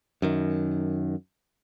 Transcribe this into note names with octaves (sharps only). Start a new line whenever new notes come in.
F#2 D#3